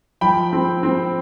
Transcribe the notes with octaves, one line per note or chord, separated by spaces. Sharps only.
F3 G5 B5
C4
C4